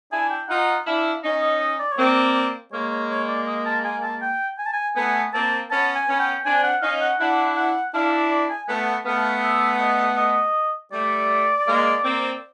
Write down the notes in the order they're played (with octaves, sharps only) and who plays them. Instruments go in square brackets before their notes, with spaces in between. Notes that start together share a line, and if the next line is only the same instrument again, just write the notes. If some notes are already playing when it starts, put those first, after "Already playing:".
[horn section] D4 E4 [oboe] G#5
[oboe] G5
[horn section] D#4 F4 [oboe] F#5
[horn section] D4 E4 [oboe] F5
[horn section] C#4 D#4
[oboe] D#5
D#5
D5
C#5
[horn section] A#3 C4
[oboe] D5
[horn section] G#3 A#3 [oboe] C#5
[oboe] C#5
C#5
D5
D#5
A5
G#5
A5
G5
G#5
A5
G#5
[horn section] A3 B3 [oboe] G#5
[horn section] A#3 C4 [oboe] A5
[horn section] B3 C#4 [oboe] A5
[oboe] G#5
[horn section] B3 C#4 [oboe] G#5
[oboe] G5
[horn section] C4 D4 [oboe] G#5
[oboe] F#5
[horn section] C#4 D#4 [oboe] F5
[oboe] F#5
[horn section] D4 E4 [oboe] F#5
[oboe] F#5
[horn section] D4 E4 [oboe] F5
[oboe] D5
D5
G#5
[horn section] A3 B3 [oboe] F#5
[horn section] A3 B3 [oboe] F5
[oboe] E5
D#5
D#5
[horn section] G3 A3 [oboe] D5
[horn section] G#3 A#3
A#3 C4